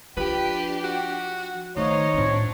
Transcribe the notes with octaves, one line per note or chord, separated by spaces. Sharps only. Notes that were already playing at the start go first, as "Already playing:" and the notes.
F3 D4 G4 B4
F#4
D#3 A3 D#4 C5 C#5 D#5 F5
A2 F3 C4 D4